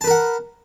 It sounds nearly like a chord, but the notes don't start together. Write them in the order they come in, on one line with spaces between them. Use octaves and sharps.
A5 B4 A#4 F#5